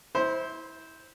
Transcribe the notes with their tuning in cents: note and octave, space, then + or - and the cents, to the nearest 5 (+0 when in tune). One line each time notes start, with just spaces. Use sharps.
E4 -25 C5 +0